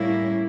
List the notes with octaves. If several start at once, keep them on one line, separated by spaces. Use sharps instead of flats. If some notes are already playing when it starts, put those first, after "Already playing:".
Already playing: A2 G3 A#3 C#4 E4